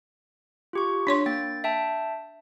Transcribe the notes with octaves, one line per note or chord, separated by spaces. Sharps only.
F4 G4 C#6
D4 C#5 C6
A#3 G5 A6
E5 G5 A5